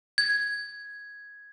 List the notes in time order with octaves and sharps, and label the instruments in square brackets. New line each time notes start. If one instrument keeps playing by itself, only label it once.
[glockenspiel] G#6